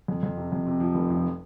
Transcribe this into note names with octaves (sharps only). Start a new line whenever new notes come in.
F2
F2
C3
F2
C3
F3
F1
F3